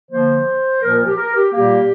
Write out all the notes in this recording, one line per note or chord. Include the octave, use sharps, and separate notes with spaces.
D3 F3 A#3 C5
A#2 F3 A#3 A#4
A#4
G4
A#4
G4
A#2 G3 A#3 G4